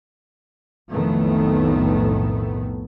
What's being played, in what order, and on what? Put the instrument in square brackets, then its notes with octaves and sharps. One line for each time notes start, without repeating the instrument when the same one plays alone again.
[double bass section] B1 F2 A2 D#3 A3 B3